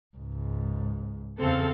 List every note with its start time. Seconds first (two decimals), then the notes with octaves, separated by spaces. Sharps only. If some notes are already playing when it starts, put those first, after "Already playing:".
0.17 C#2 G#2
1.40 E2 C#3 C4 A4 F5